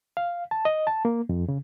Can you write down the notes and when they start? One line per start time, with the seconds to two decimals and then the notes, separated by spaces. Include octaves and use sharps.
0.17 F5
0.51 A5
0.65 D#5
0.87 A5
1.05 A#3
1.29 F2
1.48 C#3